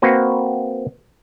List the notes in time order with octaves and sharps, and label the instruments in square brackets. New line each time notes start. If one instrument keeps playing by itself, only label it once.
[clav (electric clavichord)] A#3 C4 F#4 B4